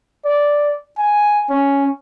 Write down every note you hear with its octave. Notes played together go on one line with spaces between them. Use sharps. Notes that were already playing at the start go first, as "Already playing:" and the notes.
D5
G#5
C#4